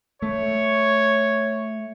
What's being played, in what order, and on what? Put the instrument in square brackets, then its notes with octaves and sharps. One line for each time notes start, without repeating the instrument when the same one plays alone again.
[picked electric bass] A3 [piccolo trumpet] C#5